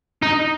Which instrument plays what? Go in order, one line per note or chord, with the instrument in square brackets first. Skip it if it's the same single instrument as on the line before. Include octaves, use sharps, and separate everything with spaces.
[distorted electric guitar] D#4